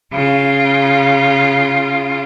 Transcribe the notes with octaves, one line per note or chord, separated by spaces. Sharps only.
C#3 F4